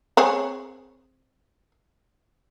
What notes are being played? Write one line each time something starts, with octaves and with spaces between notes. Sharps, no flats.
C4 G#4 C#5